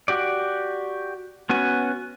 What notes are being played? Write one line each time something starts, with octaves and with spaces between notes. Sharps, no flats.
F#4 G4 D5
B3 C#4 F#4 G#5